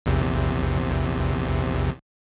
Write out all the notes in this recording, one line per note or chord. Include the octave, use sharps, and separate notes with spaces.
A#1 E2 C3